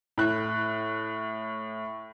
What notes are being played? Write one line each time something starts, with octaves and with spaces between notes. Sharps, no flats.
A2 F#6